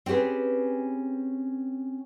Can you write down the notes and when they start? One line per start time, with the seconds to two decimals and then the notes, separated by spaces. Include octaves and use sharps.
0.06 C4 C#4 G4 G#4 B4